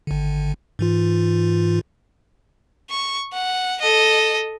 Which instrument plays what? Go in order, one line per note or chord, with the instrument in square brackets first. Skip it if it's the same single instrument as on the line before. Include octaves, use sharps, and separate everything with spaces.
[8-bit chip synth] G#1 D3
G#2 E3 F4
[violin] C#6
F#5
A4 D#5